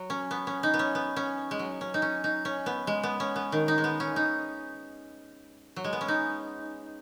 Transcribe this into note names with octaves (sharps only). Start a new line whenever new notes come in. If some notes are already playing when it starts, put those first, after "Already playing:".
Already playing: F#3
C#4
B3
C#4
D#4
B3
C#4
B3
C#4
G#3
F#3
C#4
D#4
C#4
D#4
C#4
B3
G#3
B3
C#4
B3
D#3
D#4
G#3
B3
C#4
D#4
F#3
G#3
B3
C#4
D#4